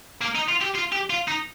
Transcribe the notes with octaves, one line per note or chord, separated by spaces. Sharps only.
A#3
D#4
F4
G4
F4
G4
F4
D#4